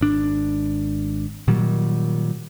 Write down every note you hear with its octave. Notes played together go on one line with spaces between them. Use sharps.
G#1 D4
A#2 D#3 F#3 G3